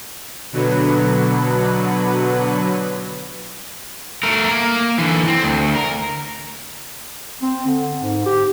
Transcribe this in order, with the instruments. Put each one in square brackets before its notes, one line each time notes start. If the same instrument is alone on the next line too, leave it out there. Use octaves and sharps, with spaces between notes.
[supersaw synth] B2 D3 F#3 B4
[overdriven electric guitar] A3 A#4
A#3
D3 E3
C4
D2
A#4
[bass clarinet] C4
D3
G#2
G4